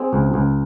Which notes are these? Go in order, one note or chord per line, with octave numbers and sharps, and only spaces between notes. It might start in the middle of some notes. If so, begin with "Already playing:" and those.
Already playing: C4 G#4
C#2
C#2